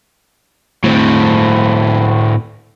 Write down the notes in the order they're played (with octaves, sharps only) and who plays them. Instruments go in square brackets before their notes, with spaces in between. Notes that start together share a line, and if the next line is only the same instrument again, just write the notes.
[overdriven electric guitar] A2 C4